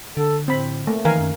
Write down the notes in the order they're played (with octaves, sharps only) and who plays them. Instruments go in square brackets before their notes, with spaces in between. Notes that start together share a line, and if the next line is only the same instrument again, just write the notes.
[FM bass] D3 [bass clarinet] A4
[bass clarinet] A2 [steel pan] C4 B5
[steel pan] A3 A#3
[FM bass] D#3 [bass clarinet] E3 [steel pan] A#4 F5 G#5
[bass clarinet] F#2